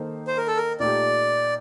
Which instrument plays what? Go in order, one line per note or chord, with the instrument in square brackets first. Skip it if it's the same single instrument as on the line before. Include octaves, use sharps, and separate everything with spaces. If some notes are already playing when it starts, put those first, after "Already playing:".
Already playing: [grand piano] D#3 A#3 D#4 A4 C5
[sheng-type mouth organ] C5
A#4
A4
A#4
[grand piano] A#2 A3 D#4 G4 [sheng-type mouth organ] D5